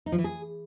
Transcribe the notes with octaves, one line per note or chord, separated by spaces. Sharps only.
D#4
F3
E3
G#4